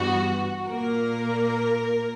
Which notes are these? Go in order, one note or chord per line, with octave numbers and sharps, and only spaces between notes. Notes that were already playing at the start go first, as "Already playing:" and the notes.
Already playing: G2 E3 G3 B3 F#4
A#2 A#3 A#4